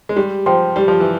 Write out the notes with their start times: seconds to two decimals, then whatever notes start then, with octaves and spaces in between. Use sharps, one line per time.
0.09 G#3
0.17 G3 G4
0.46 F3 C5 G5 C6
0.76 G3 G4
0.88 F3
1.00 E3